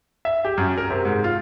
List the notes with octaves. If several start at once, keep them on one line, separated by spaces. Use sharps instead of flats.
E5
G4
F#2
A#4
C3
G#2
F4